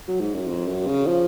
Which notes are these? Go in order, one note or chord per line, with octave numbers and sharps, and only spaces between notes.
F#3
G#2
F#2
F2
F#2
C#3
F3